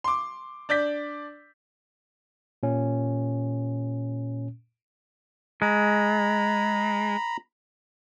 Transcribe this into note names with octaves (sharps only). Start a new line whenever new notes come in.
C6 D6
D4 D5 G6 B6
A#2 C#4
G#3 A#5 B5